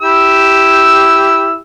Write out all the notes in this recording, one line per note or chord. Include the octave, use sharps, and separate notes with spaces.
E4 G4 E6